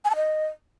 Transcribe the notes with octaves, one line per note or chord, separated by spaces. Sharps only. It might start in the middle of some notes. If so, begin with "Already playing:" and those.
G#5
A5
D#5